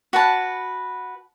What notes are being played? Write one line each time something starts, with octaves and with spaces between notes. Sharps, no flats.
F#4 B4 A5